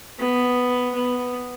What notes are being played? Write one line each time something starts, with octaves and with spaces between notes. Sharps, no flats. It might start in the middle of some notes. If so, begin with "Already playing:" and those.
B3
B3